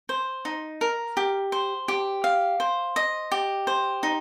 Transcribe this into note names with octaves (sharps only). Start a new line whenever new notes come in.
C5
D#4
A#4
G4
C5
G4
F5
C5
D#5
G4
C5
D#4